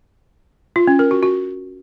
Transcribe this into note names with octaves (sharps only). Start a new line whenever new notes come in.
F4
C#4
A#4
F#4
F#4